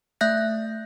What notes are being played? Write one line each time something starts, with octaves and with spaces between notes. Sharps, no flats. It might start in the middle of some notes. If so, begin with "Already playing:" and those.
A3 E5 F#6 G6 A#6